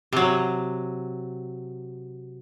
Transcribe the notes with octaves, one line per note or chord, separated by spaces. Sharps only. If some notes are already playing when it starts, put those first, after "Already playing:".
C3 F#3